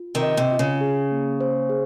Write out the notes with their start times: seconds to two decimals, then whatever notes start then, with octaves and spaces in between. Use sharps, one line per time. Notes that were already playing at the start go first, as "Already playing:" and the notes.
Already playing: F4
0.15 C3 D#3
0.23 D#5
0.37 C3
0.52 F4
0.59 C#3
0.81 G#4
1.11 A#3
1.41 C5
1.70 G#4